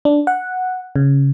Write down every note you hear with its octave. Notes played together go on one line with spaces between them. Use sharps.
D4
F#5
C#3